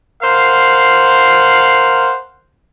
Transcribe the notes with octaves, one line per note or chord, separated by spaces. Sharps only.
A#4 C5 F5 F#5